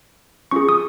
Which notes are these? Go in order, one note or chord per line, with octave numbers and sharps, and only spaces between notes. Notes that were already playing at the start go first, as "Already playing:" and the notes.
C#4 F4 G#4 C#6
D#6